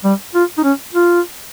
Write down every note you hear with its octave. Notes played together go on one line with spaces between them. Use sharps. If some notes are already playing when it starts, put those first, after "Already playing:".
G3
F4
D#4
C#4
F4